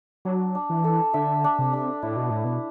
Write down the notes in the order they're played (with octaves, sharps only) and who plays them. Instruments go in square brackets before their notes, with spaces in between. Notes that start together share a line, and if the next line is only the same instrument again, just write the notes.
[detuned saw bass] F#3 [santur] D4
[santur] D4
[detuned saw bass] E3
[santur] A4
[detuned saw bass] D3 [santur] E5
[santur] D4
[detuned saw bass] C3
[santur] D4
[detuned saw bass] A2 [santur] E4
[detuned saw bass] B2
[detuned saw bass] A2 [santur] E4
[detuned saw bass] B2